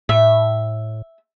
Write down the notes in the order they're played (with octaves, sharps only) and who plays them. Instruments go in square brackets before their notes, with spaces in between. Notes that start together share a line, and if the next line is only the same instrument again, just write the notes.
[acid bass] A2 [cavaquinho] E5